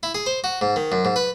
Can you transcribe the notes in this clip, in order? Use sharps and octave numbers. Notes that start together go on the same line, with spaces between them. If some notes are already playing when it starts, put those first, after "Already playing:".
E4
G#4
C5
F#4
G#2
D#3
F#2
G#2
B4